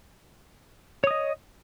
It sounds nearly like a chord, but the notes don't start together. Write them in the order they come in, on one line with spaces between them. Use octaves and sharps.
C#5 D#6 D#5